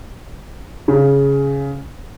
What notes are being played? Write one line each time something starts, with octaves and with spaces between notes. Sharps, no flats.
C#3